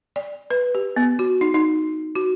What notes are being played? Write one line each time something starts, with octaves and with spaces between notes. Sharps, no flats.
D5
B4
G4
B3
F#4
D#4
D#4
F#4